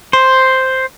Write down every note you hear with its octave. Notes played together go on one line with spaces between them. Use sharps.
C5